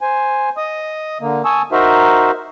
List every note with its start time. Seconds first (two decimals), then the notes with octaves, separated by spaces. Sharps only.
0.01 C5 G#5
0.57 D#5 D#6
1.21 D3 A#3
1.45 G#5 A5 C#6 D#6 E6
1.72 D#4 F#4 A#4 C5 E5